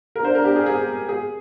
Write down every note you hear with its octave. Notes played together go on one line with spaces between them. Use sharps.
A#4
D4 C5
A#4
G4
G#4
G#4
G#4